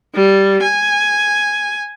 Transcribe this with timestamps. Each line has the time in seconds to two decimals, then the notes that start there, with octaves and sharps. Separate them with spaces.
0.15 G3
0.62 G#5